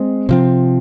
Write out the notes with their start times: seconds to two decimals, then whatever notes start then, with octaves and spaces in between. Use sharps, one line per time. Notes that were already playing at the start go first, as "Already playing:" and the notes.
Already playing: G#3 C4
0.29 C3 F3 C4